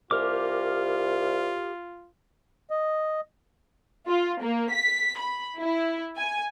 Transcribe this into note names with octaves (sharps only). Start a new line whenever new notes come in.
C2 F4 G4 A#4 D6
D#5
F4
A#3
B6
B5
E4
G#5